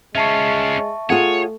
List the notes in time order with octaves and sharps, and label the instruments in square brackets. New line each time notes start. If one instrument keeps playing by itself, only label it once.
[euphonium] G#3 [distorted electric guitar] C#4 F4 [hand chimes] E5 A5 C#6
[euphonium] A3 [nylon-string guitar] F4 G#4 F#5 [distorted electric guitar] C#5